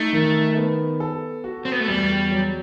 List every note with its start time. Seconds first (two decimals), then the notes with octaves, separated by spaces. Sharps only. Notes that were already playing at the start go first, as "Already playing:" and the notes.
Already playing: A3 D#4
0.13 D#3
0.57 B3
1.00 A4
1.44 F#4
1.65 C4
1.72 B3
1.80 A3
1.88 E2 G3
2.31 F#3